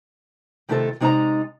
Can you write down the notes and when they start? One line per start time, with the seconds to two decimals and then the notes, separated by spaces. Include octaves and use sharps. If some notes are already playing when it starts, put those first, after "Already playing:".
0.69 C3 D#3 A3 E4 F4 A4
1.00 C3 G#3 D#4 A4 D5 A#5